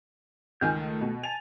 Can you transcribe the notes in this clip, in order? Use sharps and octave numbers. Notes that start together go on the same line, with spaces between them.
C#2 D#3 G#5 F6 G6
A3
B2
G#5 A5 F7